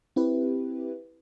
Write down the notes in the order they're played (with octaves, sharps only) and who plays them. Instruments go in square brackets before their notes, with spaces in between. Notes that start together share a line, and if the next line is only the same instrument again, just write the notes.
[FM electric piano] C4 E4 G4 B4